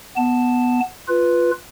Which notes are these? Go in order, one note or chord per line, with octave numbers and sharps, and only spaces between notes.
B3 A5
F4 B4